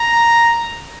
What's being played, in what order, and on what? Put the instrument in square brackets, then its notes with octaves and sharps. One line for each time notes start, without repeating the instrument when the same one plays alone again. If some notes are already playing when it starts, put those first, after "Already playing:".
Already playing: [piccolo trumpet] A#5